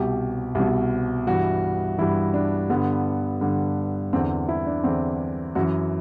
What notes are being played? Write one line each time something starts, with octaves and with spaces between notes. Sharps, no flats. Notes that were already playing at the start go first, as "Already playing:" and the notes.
Already playing: C2 B2 G4
C2 B2
G2 E3 F#4
G2 E3 E4
D4
G2 D3 B3
G2 D3
E2 D3 C4
E4
D4
E2 D3 C4
F#2 E3 F#4